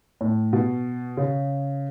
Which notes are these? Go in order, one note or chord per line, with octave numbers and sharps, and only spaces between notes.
A2
B2
C#3